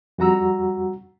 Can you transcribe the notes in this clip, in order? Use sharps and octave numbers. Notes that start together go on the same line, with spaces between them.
F2 G3 F#4 F#5 A#5 E6